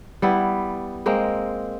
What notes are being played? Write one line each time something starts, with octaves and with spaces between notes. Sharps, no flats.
G3 B3 E4
G#3 A#3 C4